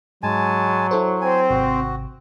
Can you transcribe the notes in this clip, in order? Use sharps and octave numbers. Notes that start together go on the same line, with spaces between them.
G#2 F#3 G#3 G#5 A5
E4 A4 C5
C4 G#5
G#1 C3 F#4